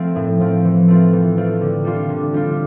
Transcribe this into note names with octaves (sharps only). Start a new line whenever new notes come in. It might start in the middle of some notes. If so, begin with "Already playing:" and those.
Already playing: F3 A3 C4
A2
F3 A3 C4
E3
A3 C4 F4
E3
A3 C4 F4
D3
G3 D4 F4
D3
G3 D4 F4